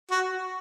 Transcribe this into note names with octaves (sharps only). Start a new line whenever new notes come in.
F#4